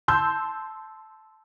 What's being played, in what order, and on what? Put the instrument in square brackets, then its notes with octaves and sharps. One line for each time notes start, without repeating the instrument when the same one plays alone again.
[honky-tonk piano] A5 C6 E6 G6